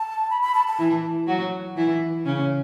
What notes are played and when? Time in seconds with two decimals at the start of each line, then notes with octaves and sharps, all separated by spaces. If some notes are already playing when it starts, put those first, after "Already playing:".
Already playing: A5
0.30 B5
0.42 B5
0.55 A5
0.67 A5
0.79 E3 E4
1.28 F#3 F#4
1.76 E3 E4
2.26 C#3 C#4